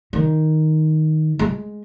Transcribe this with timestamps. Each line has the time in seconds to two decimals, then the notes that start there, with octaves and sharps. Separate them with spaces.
0.13 D#3
1.39 G#3